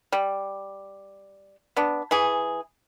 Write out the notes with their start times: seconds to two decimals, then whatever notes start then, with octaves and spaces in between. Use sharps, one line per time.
0.12 G3
1.77 B3 D4
2.11 E3 G#4